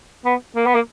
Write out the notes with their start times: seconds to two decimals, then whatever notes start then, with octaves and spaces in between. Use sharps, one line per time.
0.25 B3
0.56 A#3
0.66 B3
0.75 A#3